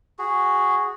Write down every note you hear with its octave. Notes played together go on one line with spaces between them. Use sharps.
F#4 G#4